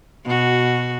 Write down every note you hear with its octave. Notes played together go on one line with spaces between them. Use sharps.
B2 F#4